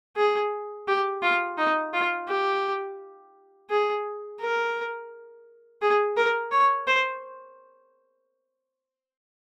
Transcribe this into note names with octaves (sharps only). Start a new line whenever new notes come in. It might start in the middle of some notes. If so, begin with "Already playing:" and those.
G#4
G4
F4
D#4
F4
G4
G#4
A#4
G#4
A#4
C#5
C5